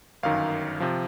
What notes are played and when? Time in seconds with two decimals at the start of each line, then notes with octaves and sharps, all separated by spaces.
0.23 G1 F#2 D#3 F5
0.80 C3 F3